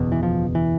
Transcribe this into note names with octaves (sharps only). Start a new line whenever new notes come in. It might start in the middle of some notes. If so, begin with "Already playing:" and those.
Already playing: F#1 E2 B2
E3
F3
E3